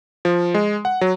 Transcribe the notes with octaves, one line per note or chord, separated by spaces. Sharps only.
F3
G#3
F#5
F#3